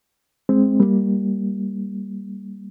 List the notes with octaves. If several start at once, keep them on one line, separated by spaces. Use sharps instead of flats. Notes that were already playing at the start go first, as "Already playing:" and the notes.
G#3 C4
G3 A#3